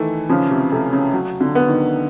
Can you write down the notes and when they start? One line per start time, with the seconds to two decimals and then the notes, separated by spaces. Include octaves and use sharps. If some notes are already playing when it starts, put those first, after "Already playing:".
Already playing: D#3 E3 A3 E4
0.29 C#3 F3
0.50 C3
0.72 C3 A3
0.93 C#3
1.13 F#3
1.41 D3
1.55 B3
1.68 D#3